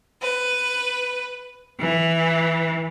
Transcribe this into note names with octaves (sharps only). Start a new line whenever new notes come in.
B4
E3